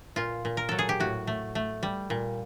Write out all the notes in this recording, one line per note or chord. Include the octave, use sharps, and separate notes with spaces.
A#2 F4
A#2
A#4
F#3 A4
G#4
G4
A2 F#4
A3
A3
G3
A#2